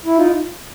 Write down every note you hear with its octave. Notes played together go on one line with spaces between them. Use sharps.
E4
D#4 F4